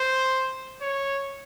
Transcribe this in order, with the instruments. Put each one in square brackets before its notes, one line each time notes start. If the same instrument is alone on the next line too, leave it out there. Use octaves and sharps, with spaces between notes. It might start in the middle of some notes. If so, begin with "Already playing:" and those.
Already playing: [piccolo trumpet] C5
C#5